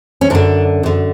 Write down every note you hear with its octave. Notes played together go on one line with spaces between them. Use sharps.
C#4
F#2 D3 D4
F#2 D3